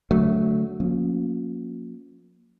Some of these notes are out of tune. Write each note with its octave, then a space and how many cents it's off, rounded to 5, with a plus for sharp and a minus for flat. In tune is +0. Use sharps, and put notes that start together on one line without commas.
D3 -20 F#3 +0 A3 -10
F3 +40 A#3 +0 C#4 +0